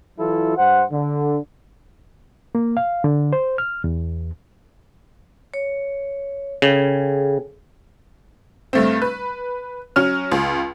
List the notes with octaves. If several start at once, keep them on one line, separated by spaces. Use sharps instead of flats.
E3 F#3 E4 F4 A4
G2 C5 F#5
D3
A#3
F5
D3
C5
F6
E2
C#5
C#3 G#4 A4 G5
G2 A3 C4
B4
F#3 C#4 F6
C#2